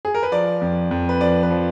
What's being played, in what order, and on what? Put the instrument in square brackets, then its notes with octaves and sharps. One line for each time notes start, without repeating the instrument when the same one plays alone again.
[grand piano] G#4
A#4
B4
F3 D5
F2
F2
B4
F3 D5
B4
F3